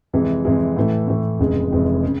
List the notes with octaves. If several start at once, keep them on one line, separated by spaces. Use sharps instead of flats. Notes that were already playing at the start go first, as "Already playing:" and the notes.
F2 C3 E3 G#3
F2 C3 E3 G#3
A2 E3 A3
A2 E3 A3
F1 F2 C#3 E3 G#3
F1 F2 C#3 E3 G#3
C#3